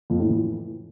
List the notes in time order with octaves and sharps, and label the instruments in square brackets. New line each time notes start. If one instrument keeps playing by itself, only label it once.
[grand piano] F2
A2
E3